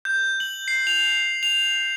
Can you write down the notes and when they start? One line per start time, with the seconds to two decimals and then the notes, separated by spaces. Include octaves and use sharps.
0.05 G6
0.40 F#7
0.68 C7
0.87 F7
1.43 F7